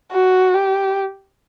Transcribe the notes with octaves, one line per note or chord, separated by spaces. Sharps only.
F#4
G4